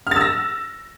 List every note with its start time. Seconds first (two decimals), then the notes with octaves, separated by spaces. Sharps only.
0.07 F6
0.11 A6
0.16 E6
0.21 A#6